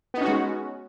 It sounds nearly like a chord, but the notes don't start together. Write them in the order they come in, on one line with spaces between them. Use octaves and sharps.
B3 D#4 C#4 F#4 G#3